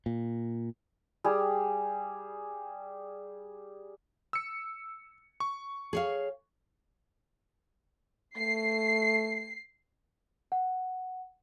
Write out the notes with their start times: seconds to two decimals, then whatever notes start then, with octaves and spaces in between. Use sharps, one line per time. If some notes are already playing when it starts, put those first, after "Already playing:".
0.06 A#2
1.24 G3 G#4
4.33 E6 C#7
5.40 C#6
5.93 G#4 C#5 F5
8.37 A3 C7
10.52 F#5